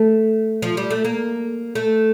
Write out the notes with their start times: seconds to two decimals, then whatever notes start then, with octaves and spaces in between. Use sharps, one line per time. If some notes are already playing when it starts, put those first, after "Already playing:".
Already playing: A3
0.62 F3
0.77 G3
0.90 A3
1.05 A#3
1.75 A3